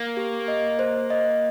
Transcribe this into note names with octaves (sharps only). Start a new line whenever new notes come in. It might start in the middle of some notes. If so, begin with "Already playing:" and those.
Already playing: A#3
G4
D#5
C5
D#5